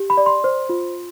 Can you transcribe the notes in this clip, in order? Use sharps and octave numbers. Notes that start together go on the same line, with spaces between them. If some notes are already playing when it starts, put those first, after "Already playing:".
Already playing: G4
B5
D5
C6
C5
F4